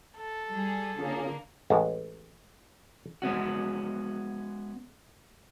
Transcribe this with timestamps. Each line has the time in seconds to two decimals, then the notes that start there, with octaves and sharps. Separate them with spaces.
0.17 A4
0.51 G3 G#4
0.99 D3 A#3 C#4 F4 G#4
1.70 A1 G#3
3.22 G#3 B3 C#4 F#4